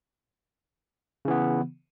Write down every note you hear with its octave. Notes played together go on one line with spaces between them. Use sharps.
C#3 E3 B3